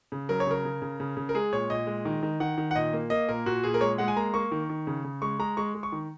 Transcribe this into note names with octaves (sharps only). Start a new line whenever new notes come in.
C#3
F#3 A#4
C#5
C#3 A#4
C#3
C#3
C#3
C#3
A#4
G#3 G#4
A#2 C#5
A#2 D#5
G#3
D#3
D#3
D#3 F#5
D#3
F#5
A#2 D#5
A#3
A#3 D#5
A#2 A#4
A#2 F#4
A#2 G#4
A#4
G#3 C#5
G#3 F#5
G#5
A#3 A#5
A#3 C#6
D#3
D#3
C#3
C#3
G#3 C#6
G#3 A#5
G#3 C#6
G#3
C#6
D#3